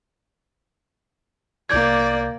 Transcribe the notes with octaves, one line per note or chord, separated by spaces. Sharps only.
C2 A#3 D5 G6 G#6